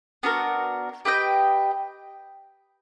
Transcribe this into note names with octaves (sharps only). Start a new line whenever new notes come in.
B3 D4 F#4 A#4
G4 B4 D#5 G5